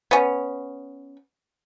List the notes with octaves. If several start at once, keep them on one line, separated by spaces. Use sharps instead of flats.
B3 C#4